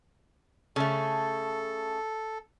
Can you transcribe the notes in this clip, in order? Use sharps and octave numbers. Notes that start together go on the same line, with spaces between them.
C#3 A3 A4